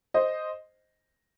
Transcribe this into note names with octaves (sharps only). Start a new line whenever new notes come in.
C5 D#5